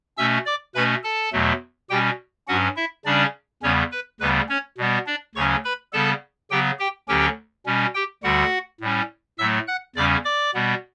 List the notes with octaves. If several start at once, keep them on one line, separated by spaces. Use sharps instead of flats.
B2 A3 C#4 E5 E6
D5 D6
B2 A3 C#4 B4 B5
A4 A5
E2 B2 F#3 A3
B2 G3 C#4 G4 G5
G2 F#3 C#4 F#4 F#5
E4 E5
C#3 G3 C#4 D4 D5
E2 C#3 G3 B3 C#4 C#5
B4
D2 C#3 G3 B3 B4
C#4 C#5
B2 G3 B3
D4 D5
D2 C#3 F#3 C#4 C#5 C#6
B4 B5
C#3 G3 B3 A4 A5
C#3 F#3 B3 G4 G5
G4 G5
D2 D3 F#3 C#4 G4 G5
B2 G3 C#4
G4 G5
D2 D3 G3 F#4 F#5
A2 G3 C#4
A2 F#3 A3 E5 E6
F#5 F#6
E2 C#3 G3 C#4 D5 D6
D5 D6
B2 G3 B3